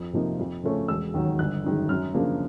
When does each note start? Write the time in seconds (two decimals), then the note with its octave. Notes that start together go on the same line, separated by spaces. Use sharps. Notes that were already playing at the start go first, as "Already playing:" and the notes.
Already playing: F2
0.13 C3 F3 A#3 D#4
0.39 F2
0.63 C#3 F3 A3 C#4
0.88 E1 E6
1.14 D#2 D#3 F#3
1.39 G1 F#6
1.64 F#2 D#3 G#3
1.89 F#2 F6
2.14 C#3 F3 A#3 D4